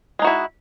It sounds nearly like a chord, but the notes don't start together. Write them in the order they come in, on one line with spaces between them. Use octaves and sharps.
G#3 D#4 F#4 E4